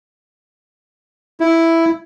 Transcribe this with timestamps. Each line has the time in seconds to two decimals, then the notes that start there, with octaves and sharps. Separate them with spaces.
1.40 E4